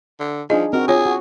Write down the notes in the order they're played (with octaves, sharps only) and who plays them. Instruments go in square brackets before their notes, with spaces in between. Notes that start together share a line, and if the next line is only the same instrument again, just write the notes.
[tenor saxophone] D3
[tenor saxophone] F3 [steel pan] D4 D#4 G#4 [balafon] D#5
[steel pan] C4 F#4 [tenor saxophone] A#4
[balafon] F4 C#5 [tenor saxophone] G#4
[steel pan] F#4